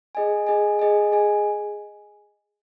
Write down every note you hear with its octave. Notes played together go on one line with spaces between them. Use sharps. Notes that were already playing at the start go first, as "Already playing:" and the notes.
G#4 D#5 G#5
G#4 D#5 G#5
G#4 D#5 G#5
G#4 D#5 G#5